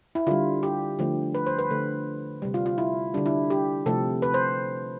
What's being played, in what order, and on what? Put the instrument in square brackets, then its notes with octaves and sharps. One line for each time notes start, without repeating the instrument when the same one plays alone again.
[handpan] E4
D3 G3 F4
G4
D3 F3 A3
B4
C5
B4
D3 A3
C3 G3
F4
F4
E4
D3 G3 D4
E4
G4
C3 F3 A3 A4
B4
C5